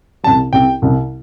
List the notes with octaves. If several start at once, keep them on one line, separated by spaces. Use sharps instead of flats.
C2 C3 G3 A5
C2 C3 G3 G5
C2 C3 G3